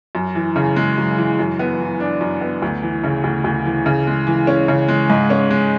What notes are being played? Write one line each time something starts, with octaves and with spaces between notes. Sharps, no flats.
F#2
E3
C#3
G#3
F#2
E3
F#2
B3
E3
D4
F#2
B3
D2
E3
C#3
D2
D2
E3
C#3
G#3
E3
C#4
C#3
G#3
G#2
C#4
G#3